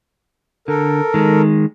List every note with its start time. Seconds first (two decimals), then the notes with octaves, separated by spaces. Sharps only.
0.68 D3 A4 A#4
1.14 D#3 G#3